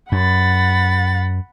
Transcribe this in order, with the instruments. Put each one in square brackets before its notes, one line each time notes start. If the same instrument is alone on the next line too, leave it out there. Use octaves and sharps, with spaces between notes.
[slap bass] F#2 [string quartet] F#5 B5 A6